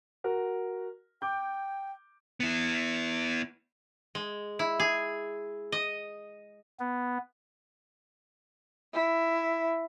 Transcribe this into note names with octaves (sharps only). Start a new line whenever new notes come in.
F#4 A#4
G5 D6 G6
B3 E4
G#3
E4
G#4
D#5
B3
E4